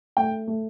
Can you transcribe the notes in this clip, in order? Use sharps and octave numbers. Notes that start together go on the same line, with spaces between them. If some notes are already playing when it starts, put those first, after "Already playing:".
A3 G5
A3